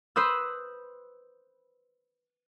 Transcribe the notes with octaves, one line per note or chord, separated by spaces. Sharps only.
B4 C5 D#6 E6